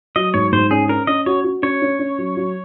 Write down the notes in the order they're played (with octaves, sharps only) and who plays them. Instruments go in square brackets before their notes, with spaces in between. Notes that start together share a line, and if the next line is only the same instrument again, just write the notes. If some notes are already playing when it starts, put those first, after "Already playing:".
[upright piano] F#3 [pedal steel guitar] D#5
[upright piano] G#2 [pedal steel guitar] C#5
[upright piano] G#2 [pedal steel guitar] C5
[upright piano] C#4 [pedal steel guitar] G#4
[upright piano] C#4 [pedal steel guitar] A#4
[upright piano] C#4 [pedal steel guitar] D#5
[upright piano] F#4 [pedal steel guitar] C#5
[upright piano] F#4
[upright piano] C#4 [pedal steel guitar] C#5
[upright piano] C#4
C#4
F#3
F#3